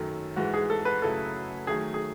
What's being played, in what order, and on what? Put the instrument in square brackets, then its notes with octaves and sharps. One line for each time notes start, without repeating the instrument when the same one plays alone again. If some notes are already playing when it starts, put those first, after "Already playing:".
Already playing: [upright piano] F#2 D#3 F#3 [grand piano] A3
[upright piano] G#2 E3 G#3 [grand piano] F#4
[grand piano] G#4
A4
B4
[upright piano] F#2 C#3 F#3 A3 E4 [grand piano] A4
[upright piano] D#3 F#3 A3 [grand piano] G#4
[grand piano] G#4